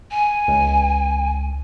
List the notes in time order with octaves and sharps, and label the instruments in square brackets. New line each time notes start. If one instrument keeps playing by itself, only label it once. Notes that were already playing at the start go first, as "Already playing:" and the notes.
[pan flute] G#5
[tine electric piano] C#2